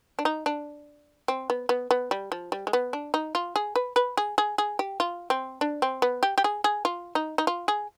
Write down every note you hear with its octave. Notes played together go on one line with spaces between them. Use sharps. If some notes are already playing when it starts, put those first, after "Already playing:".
D4
D#4
D4
C4
B3
B3
B3
G3
F3
G3
G#3
B3
D4
D#4
F4
G#4
B4
B4
G#4
G#4
G#4
G4
F4
C4
D4
C4
B3
G4
G4
G#4
G#4
F4
D#4
D#4
F4
G#4